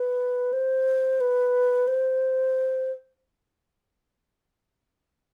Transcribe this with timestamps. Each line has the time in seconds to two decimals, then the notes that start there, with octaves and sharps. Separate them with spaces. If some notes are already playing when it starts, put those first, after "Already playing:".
Already playing: B4
0.53 C5
1.21 B4
1.88 C5